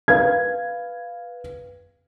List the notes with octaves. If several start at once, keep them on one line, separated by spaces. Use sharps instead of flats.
B4 F5 G#6